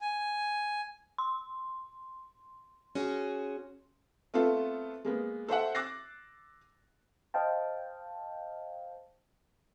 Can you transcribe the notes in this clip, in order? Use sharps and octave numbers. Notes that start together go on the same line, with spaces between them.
G#5
C6
C#4 F#4 G#4
A3 B3 C4 F4 A4
G#3 A#3 B3
A4 C5 E5 F#5
D6 E6 F#6 A6 A#6 C7
C5 D#5 F5 G5 A5